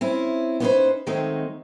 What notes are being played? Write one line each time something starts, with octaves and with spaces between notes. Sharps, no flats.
C4 C#4 E4
B3 C#4 D#4 E4 B4 C5
D#3 F#3 G#3 A3 C4 D#4